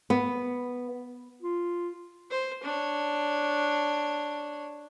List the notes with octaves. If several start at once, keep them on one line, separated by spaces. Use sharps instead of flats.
B3
F4
C5
D4 C#5